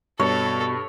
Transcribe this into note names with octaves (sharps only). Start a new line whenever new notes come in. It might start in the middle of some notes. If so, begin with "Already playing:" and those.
G2 B2 A4 C#5